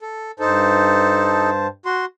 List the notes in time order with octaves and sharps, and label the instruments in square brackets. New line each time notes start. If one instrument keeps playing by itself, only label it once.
[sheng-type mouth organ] A4
[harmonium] G2 C5 A5 [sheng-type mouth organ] D#4 A4
[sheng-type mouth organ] F#4 C6